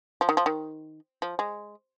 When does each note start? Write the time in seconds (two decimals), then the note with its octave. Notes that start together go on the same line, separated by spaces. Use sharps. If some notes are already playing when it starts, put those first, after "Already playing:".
0.21 F3
0.29 D#3
0.37 F3
0.46 D#3
1.22 F3
1.39 G#3